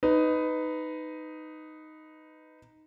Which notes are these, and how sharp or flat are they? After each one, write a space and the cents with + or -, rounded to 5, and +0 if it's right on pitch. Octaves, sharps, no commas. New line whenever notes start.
D#4 +0 B4 +15